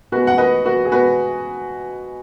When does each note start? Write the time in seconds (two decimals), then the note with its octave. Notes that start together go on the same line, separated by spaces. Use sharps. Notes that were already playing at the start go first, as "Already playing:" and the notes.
0.12 B2 G#3 F#4 B4
0.27 F#5
0.38 B4 D#5
0.65 F#4 B4
0.85 G#4
0.92 B2 G#3 F#4 B4